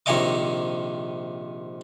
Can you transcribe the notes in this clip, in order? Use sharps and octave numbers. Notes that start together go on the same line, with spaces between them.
A#1 C3 D#3 C#5 D#5 D6